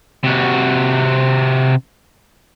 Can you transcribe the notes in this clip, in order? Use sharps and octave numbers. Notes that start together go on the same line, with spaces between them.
C3 F#4